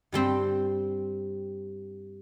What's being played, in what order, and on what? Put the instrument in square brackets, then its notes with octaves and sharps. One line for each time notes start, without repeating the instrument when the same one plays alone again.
[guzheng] G2 G3 C4 G5